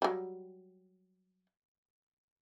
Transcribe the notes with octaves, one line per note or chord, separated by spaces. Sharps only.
F#3 G3